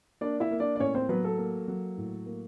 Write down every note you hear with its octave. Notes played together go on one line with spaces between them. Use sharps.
A#3 D4 D5
E4 E5
A#3
D4 D5
D5
A2 C#4 C#5
C4 C5
F#3 B3 B4
A4
A#3
F#3
A2
A#3